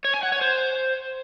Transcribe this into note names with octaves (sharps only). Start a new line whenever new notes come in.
C#5
G#5
F#5
C#5
C5